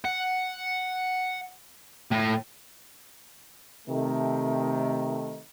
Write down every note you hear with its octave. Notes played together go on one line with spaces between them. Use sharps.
F#5
A2
C3 D#3 A3